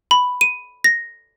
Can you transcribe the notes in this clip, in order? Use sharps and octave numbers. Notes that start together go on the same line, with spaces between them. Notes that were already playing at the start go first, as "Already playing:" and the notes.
B5
D#7
A#6